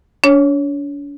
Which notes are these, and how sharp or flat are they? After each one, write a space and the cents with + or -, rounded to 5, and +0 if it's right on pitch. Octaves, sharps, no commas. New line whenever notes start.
D4 -45 C#5 +0